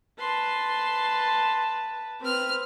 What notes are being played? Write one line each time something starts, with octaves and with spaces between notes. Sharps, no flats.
B4 A5 C6
C4 B4 F6